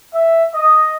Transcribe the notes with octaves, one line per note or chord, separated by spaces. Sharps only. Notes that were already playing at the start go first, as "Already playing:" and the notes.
E5
D#5